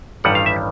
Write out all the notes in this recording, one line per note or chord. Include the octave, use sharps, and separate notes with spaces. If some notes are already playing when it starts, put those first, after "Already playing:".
A1 G2 D#3 G3 F#5
F5
E5